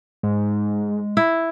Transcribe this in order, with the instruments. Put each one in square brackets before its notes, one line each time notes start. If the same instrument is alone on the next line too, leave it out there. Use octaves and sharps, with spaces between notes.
[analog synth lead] G#2 [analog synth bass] G#3
[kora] E4